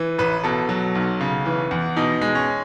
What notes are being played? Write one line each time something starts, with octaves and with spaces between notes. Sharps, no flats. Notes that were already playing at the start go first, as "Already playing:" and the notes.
Already playing: E3
A1 B4
B2 A4
F#3
B1
C#3
E3
E2
B2 D#4
G#3
C#4